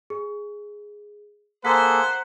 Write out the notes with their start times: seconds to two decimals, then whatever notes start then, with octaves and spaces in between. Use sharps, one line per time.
0.10 G#4
1.65 A#3 G#4 A4 C5 F#5 A#5 B6